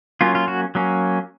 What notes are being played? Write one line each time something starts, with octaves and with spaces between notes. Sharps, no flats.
F#3 A#3 C#4 F4
F4
F#4
F#3 A#3 C#4